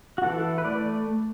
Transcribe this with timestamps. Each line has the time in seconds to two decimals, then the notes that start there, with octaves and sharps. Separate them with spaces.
0.18 F#4
0.23 E3 A4
0.58 B4
0.64 A3 D5